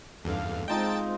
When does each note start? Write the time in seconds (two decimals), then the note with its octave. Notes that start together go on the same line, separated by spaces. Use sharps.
0.24 E2 G2 D4 A4 F5
0.68 G#3 C4 D#4 F4 D#5 G5 A5 A6